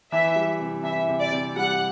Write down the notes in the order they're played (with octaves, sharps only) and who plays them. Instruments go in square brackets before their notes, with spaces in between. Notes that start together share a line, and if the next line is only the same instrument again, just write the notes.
[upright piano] E3 [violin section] E5
[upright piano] G3
C3
[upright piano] E3 [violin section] E5
[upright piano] C3
[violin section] D5
[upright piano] C3
[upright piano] G3 [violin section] F#5